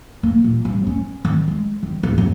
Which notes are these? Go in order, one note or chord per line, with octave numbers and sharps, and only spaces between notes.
A#3
A#2
G2
C#4
D#3
G#3
D#3
D1
F#2